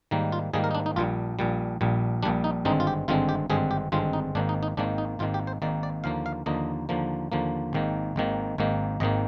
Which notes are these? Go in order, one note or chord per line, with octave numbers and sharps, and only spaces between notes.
G#2 D#3 G3 A#3
F4
G#2 D#3 G3 A#3 G#4
A#4
D#4
D4
D#4
A#1 A#2 G3 F4
A#1 A#2 G3
A#1 A#2 G3
A#1 A#2 G3 D4
D#4
G#1 G2 D3 G#3 C4 D#4
F4
G4
G#1 G2 D3 G#3 C4 F4
G4
G#1 G2 D3 G#3 C4 G#4
G4
G#1 G2 D3 G#3 C4 F4
D#4
G#1 G#2 D#3 A#3 D4
D#4
D#4
G#1 G#2 D#3 A#3 D4
D#4
G#1 G#2 D#3 A#3 F4
G4
C5
G#1 G#2 D#3 A#3 D5
D5
D#2 D3 F3 A#3 F5
F5
D#2 D3 F3 A#3 D#5
D#2 D3 F3 A#3
D#2 D3 F3 A#3
G#1 G#2 D#3 A#3
G#1 G#2 D#3 A#3
G#1 G#2 D#3 A#3
G#1 G#2 D#3 A#3 D#5